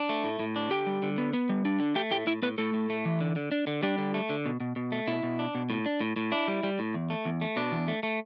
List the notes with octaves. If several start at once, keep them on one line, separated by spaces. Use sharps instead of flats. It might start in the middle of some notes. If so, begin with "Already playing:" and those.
Already playing: D4
A3
A2
A2
D4
D3 G4 G5
G3
D3
B3
B3
G3
D4
D3
A3 G4 G5
A2 G4 G5
A2 E4 E5
A2 B3 B4
A2 A3 A4
A2
A3
E3
D3
D3
D4
D3
G3 D4 G4
D3
A3
D3
B2
B2
B2
A3
B2 E4
B2
D4
B2
A2
D4
A2
A2
D4 E4
G3
G3
A2
E2
A3
E2
A3
B2 D4
E2
A3
A3